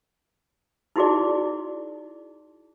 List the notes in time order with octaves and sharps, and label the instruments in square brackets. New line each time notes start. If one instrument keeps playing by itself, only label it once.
[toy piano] D#4 E4 F#4 G#4 D5